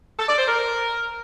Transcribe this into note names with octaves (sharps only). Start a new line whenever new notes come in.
A4
D5
C5
A#4